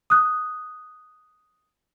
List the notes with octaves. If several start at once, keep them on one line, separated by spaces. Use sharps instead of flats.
D#6 F#6